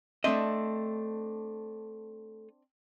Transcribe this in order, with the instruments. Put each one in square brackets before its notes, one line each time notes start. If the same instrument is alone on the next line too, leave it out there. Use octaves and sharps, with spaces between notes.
[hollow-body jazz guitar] A3 D#5 [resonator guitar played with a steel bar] C4 D4 E5